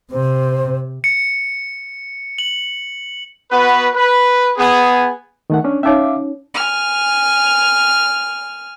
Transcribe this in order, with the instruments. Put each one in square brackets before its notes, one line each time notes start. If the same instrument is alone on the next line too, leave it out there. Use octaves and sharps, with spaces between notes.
[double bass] C3 [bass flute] C5
[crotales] C#7
F#7
[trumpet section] B3 F#4 B4
B4
B3 G#4
[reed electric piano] D#3 A3 F#5
C#4 D4
[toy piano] C#4 D#4 C#5 [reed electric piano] E5 F5 D6
[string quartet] G#5 F6